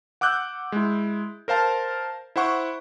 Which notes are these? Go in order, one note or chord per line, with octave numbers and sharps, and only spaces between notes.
F#5 D6 E6 F#6 G6
G#3 E4
A#4 C5 F5 A5
E4 C5 F#5 C#6